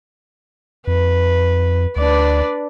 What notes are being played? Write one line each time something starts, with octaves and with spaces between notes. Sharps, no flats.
F2 B4
D2 D4 B4 D5